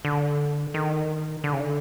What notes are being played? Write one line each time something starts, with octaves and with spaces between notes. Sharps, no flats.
D3
D#3
D3
C#3
D3